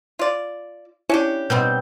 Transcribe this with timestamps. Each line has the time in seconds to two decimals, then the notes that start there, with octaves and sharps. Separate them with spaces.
0.19 F4 D5
1.09 C#4 D4 E4 G4
1.50 B2 G3 C4 G6